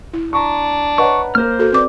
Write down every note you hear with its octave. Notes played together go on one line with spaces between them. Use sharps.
E4
D4 A#5 C#6
B4 C#5 D#5 F#5 A#5 C#6
A#3 A#4 C5 F6
F#4 A4
C4 B4 D5 D6